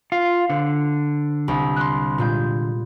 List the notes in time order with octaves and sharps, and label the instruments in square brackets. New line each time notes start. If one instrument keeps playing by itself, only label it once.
[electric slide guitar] F4
[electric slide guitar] D3 [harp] C5
[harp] C2
C6 F#6
A#2 G#3 G6